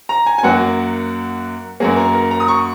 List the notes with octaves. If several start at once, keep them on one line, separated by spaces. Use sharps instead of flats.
A#5
G#5
G#5
F#2 F#3 A#3 F#5
F#2 F#3 A#3 G#4
A#4
A#4
A#5
D#6
C#6